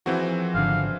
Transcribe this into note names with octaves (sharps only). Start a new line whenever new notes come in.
E3 F3 C4 F#4 G#4 A#4
G#1 D3 F5